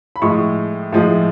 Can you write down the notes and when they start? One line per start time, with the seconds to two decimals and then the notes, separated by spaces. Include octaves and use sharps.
0.16 B5
0.22 A2 F3 G#3 C#6
0.92 A2 F3 G#3